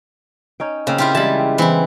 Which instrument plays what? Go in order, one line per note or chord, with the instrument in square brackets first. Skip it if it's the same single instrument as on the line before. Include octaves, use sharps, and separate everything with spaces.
[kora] C#4 D#4 G5
[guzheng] C#3 [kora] A#3 C4
[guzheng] E4 F4 G4
[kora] E3 G3 G#3 [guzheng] A5 B5
[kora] C4
[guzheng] E3 E4 [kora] B3 C4 C5